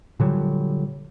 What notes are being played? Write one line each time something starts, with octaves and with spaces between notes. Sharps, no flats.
A#2 D3 F#3 G3